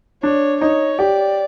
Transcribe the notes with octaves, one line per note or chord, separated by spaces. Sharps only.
D4 C#5
D#4 C#5
G4 D5